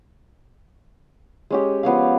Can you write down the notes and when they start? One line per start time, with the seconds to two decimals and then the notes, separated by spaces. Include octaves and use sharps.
1.50 G#3 C#4 G4
1.83 F3 B3 C#4 F5